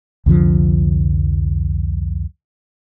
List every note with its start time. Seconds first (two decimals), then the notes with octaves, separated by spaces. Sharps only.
0.26 C2 F2 D3 F3